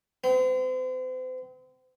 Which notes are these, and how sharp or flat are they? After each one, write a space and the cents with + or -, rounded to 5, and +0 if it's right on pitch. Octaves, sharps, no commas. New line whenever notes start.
C4 -40